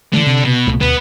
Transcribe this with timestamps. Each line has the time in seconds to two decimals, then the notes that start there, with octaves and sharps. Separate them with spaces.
0.13 D3 E3 F#3 A3
0.26 C3
0.45 B2
0.67 C2 A#2 A3
0.81 D1 D2 B2 B3